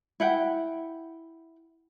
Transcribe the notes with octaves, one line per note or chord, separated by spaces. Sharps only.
E4 F#5 G5